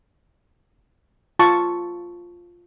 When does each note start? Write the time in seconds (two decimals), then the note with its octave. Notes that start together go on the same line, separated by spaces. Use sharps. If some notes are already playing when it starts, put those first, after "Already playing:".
1.39 F4 A5 C#6